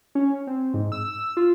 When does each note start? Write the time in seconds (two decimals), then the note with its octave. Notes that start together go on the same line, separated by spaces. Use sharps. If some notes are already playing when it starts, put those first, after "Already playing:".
0.15 C#4
0.47 C4
0.74 G#2
0.92 E6
1.37 F4